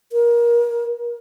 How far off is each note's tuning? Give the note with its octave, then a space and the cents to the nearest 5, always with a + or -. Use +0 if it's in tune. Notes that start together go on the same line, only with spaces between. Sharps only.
A#4 +25